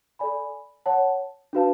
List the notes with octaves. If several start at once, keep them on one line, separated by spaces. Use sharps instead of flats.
A4 D5 G#5 B5
C#5 F#5 A5
D4 F#4 B4 F5 A5